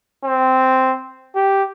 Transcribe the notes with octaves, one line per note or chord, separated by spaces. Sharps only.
C4
G4